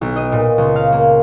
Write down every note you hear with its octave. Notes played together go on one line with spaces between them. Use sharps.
B1
D#5
A#2
C#2
F5
A#3